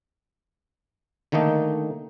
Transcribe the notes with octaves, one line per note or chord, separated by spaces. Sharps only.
D3 D#3 A3 A#3 D#4